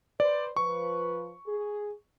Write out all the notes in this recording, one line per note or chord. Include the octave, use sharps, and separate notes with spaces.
B4 C5 D5
F3 B4 C#6
G#4